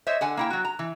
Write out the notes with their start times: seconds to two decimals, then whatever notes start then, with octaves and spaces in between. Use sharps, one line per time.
0.07 C5 C#5 D#5 E5
0.21 D3 F#5 G#5
0.37 A#3 E4 G5
0.50 F#3 F#4
0.65 A#5
0.79 E3